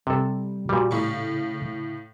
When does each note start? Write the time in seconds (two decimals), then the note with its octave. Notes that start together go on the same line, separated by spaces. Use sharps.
0.07 C3 G3 A4
0.69 A#2 G3 F#4
0.91 A2 C#3 F5 C#6